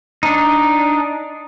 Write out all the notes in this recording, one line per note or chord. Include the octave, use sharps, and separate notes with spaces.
D4 D#4